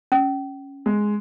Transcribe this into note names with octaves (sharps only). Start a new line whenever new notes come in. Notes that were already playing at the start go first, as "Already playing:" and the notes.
C#4
G#3